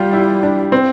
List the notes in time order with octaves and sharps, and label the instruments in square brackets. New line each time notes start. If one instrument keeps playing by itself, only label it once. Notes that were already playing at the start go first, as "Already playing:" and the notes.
Already playing: [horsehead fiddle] G3 [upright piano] F4 G4
[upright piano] E4
D4
C4